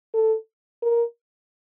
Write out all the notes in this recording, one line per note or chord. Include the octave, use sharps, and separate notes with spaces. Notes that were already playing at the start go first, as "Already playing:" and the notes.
A4
A#4